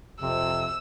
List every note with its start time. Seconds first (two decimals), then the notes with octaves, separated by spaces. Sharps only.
0.22 F2 C3 E6